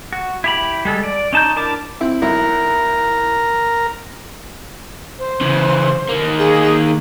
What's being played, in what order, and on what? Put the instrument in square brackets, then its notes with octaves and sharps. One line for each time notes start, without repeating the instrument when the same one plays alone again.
[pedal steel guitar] F#4
E4 G4 B5
G3 G#3 A4
D5
C#4 D#4 A5 A#5 G6
D4 E4 A#4 A5 D6
[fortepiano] C4 E4
[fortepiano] B1 F#3 E4 [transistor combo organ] A#4
[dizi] C5
[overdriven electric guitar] C#3 E3
D#3 A#3
[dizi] G#4